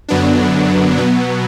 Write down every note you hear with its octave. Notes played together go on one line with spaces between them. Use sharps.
F#2 D3 F#3 B3 D4
B2 F#3 B3